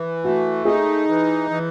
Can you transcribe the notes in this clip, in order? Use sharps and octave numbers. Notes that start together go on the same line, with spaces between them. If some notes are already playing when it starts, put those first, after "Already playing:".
Already playing: E3
A3 F#4
D#4 G#4
E3
E3